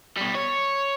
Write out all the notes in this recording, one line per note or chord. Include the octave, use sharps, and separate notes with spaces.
B2 G3
C#5